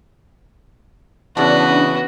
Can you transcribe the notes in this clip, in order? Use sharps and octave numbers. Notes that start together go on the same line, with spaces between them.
C#3 E3 B3 D4 F#4